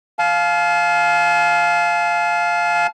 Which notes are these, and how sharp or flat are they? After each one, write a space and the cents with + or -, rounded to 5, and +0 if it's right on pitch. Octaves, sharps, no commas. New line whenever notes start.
F5 +0 A5 -45